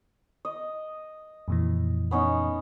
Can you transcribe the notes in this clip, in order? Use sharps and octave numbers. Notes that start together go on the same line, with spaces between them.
D#5
F2 A#2 E3
B3 C#4 D#4